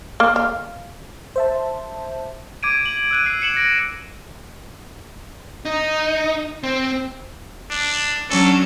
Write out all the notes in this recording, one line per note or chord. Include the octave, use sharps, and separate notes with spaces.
A#3
F5
C5 E5 A5
D6 G#6 D7 D#7
F#7
E6 F#6 D#7
E6 C7
C#7 E7 F#7
A#6 D7
D#4
C4
D4
F#3 C#4 D4 A4